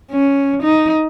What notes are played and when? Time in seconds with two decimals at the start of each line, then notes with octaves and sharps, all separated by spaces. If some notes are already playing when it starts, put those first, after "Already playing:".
0.12 C#4
0.63 D#4